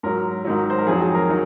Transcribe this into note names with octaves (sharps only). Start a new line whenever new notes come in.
G#2 F#3 A#4
G#2 D#3 F#3
C5
A#4
F2 D#3 F#3 G#4
G#4
A#4
D#3 F#3